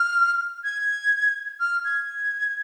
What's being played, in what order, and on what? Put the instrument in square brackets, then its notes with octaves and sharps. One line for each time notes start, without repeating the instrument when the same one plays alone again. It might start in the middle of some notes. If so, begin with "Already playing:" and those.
Already playing: [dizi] F6
G#6
F6
G#6